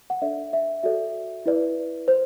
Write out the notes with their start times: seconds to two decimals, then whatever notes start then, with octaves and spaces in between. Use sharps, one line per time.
0.10 F#5
0.22 D4 A4 D5 E5
0.53 E5
0.83 F#4 A4 D5 E5
1.46 E4 B4 D5
2.08 C5